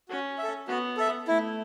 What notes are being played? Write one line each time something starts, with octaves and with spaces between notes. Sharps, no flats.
C#4 F#4
E5
A4
B3 F#4
A4 E5
A3 E4